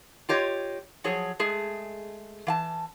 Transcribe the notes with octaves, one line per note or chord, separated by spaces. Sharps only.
F4 G4 C#5 D#5
F3 F#3 G#4 C#5
G#3 A3 G#4
E3 F5 A5